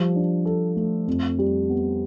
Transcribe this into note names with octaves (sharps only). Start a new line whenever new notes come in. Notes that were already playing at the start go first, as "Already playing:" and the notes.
Already playing: F3 G3
D4
A4
A3
F2
G3
B3